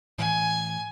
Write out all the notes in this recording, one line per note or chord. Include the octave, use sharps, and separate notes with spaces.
A2 E3 G#5